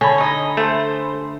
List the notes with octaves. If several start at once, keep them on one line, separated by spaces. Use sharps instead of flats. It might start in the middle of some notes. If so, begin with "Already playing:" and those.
D3 C#5 G#5 B5
D#4 D#5
A3 C5